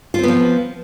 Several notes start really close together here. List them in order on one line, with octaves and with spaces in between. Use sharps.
F4 C4 B3 F3